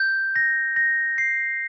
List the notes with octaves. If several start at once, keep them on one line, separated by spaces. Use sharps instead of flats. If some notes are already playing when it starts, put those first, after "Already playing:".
Already playing: G6
A#6
A#6
C7